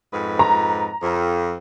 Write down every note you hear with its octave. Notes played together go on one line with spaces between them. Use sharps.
F2 G#2 B4
A#5
F2